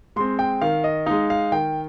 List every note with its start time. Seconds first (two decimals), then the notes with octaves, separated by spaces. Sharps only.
0.16 G#3 C4 C6
0.39 G5
0.62 D#3 F5
0.84 D#5
1.06 G#3 D#4 F5
1.30 F5
1.52 D#3 G5